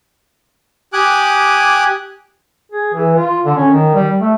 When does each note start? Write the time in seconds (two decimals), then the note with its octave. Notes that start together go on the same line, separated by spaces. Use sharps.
0.93 G4 G#5 D6 D#6 F#6
2.72 G#4
2.94 E3
3.16 F4
3.45 D3
3.57 C#4
3.70 D#3
3.95 G3
4.21 A3